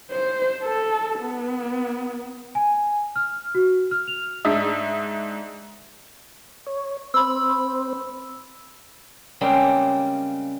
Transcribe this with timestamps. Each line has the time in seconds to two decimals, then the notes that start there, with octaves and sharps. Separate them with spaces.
0.11 C5
0.64 A4
1.20 B3
2.55 G#5
3.16 F6
3.55 F#4
3.91 F6
4.08 F7
4.45 G#2 G#3 D4 E5 D#6
6.67 C#5
7.14 C4 C5 B5 E6
9.41 C#3 G3 G#3 A#3 C4